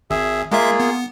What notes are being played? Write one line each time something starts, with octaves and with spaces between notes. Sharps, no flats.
G#1 G#4 E5
G#3 A#3 F4 G#4 E5
B3